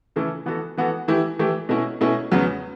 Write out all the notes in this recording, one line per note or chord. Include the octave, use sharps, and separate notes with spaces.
C#3 E3 A3 E4 A4
E3 B3 F#4 A4
E3 B3 F#4 A4
E3 A3 E4 G4
E3 A3 E4 G4
B2 A3 C#4 E4
B2 A3 C#4 E4
E2 C#3 F#3 B3